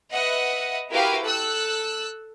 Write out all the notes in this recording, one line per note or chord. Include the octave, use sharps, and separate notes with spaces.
B4 D#5 E5 F#5
E4 F#4 G4 A#4 B4 F5
A4 E6 F#6